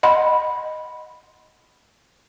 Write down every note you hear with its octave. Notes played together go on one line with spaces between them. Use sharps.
D#5 F#5 B5 C6